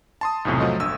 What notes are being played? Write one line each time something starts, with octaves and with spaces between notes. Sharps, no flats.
A5 C6 D#6
B1 E2 A2 C3 F3
F3 F#3 A3 D#5 C6
G1 D2 E6